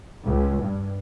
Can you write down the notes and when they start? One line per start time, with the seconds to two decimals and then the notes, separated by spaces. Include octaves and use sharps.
0.24 C#2
0.61 G2